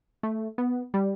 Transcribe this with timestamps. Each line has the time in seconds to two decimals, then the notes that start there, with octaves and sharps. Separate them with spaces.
0.23 A3
0.58 B3
0.94 G3